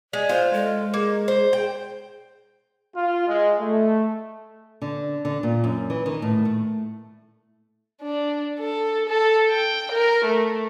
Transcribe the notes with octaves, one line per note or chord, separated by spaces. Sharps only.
G#3 D5
F4 C5
G#3 A4
A#3 G#4
C5
G5
F4
G#3
A3
D3
D3
A#2
F#2
E3
D#3
A2
A3
D4
A4
A4
G5
A#4
A3